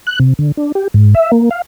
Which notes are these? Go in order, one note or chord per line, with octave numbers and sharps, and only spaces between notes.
F#6
C3
D3
D4
G4
G#2
E5
A#3
F5